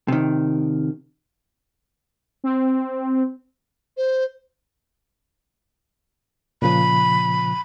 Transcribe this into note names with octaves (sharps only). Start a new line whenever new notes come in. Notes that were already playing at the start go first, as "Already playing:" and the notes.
C3 D#3
C4
C5
A#2 C#3 F3 B5